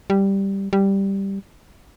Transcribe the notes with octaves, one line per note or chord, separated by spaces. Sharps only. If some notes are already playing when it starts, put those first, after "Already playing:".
G3
G3